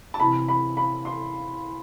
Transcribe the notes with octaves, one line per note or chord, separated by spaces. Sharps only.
A5
C3 E3 B5
B5
B5
C6